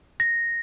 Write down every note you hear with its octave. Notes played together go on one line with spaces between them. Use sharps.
A#6